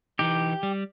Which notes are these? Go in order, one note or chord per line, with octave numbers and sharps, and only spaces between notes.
E3 D#4 G4
G3